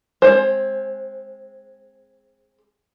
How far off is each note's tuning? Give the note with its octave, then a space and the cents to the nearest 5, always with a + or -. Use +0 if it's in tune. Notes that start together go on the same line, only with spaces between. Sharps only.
G#3 +0 C4 +0 C5 +25